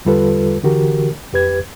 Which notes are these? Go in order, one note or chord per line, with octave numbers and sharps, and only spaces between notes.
E2 D3 G3 F4 A4 B4
D3 E3 F#4 G4 A#4
F2 G4 B4 G#6